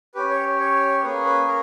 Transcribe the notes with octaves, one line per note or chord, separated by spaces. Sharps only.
C#4 G4 B4
C#5
C#5
A#3 C#4 G#4 B4
B4
A#4